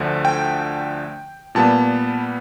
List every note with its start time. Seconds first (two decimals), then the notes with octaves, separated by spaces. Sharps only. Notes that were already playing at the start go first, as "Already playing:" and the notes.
Already playing: D2 D3 F3 A3
0.25 G5
1.55 A#2 G3 B3 A5